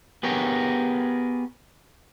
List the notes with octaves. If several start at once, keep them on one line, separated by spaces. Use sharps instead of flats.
B3 G4 G#4 A#4 C#5